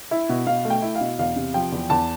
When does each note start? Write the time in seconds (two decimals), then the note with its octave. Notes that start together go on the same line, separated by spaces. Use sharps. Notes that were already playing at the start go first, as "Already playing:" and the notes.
0.11 E4
0.29 B2
0.47 B2 F5
0.65 A3
0.70 G5
0.82 E4
0.95 F5
1.01 B2
1.19 E2 F5
1.36 C3
1.54 F3 G5
1.72 E2
1.90 E2 A5